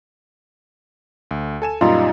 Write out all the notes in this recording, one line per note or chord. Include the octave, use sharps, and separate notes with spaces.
D2
A4 G#5 E7
F#2 A#2 G3 D#4 F4